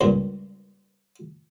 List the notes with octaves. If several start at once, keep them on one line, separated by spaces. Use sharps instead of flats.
C#2 G2 A#2